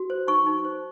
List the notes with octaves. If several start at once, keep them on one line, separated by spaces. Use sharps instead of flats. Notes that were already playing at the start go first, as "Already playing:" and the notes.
Already playing: F#4
C5
D#4 C#6
D#4
C5